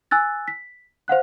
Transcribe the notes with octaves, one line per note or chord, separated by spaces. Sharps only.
G#5 E6 F#6 A6
B6
C5 F5 F#5 F#6